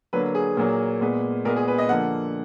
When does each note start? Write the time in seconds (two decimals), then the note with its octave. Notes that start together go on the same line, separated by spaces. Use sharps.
0.13 D3 F#3 A#3 B4
0.35 G#4
0.57 A#2 F#3 A#3
1.01 A#2 G#3 B3
1.45 A#2 G#3 B3 A#4
1.56 G#4
1.68 B4
1.78 D#5
1.89 D3 F3 A#3 F#5